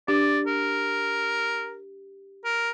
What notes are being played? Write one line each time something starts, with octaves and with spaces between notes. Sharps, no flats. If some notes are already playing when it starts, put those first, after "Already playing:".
D4 G4 D5
A#4
A#4